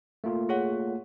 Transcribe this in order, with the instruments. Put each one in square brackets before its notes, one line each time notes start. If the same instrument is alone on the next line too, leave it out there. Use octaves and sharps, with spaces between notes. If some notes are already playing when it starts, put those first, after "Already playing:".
[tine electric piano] A3 A#3 F4
[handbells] G#4 C#5 F#5